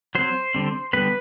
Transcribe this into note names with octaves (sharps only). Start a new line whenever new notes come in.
F#3 C4 C5
D3 G3 C4
D3 G3 B3 B4